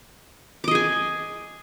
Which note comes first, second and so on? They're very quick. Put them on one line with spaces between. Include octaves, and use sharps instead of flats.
D6 D#5 G#4 G#5